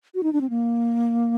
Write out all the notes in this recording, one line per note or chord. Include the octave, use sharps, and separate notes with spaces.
F#4
D#4
D4
C4
A#3